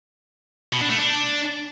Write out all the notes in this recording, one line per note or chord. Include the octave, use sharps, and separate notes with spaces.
B2
D4
A3
D4